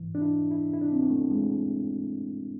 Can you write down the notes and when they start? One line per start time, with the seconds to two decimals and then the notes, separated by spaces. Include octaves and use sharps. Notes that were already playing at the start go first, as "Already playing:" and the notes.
Already playing: G#2 E3
0.15 D4
0.21 E4
0.51 E4
0.73 E4
0.82 D4
0.92 C4
1.01 B3
1.10 A3
1.31 G#3